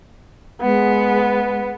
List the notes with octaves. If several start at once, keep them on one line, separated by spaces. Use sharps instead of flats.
G#3 B3